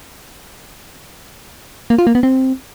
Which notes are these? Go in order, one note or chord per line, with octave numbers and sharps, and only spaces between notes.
A#3
F4
A#3
B3
C4